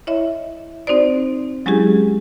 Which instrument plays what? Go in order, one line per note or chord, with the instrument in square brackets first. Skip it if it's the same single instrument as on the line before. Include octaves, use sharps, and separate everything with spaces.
[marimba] E4 C#5 D#5 E5
C4 D#4 F#4 C5 D5
F#3 G#3 C#4 E4 G4 G#4